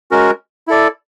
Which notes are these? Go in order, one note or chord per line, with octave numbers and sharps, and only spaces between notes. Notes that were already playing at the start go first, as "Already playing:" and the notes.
G#3 C#4 F#4 A#4
E4 A4 D5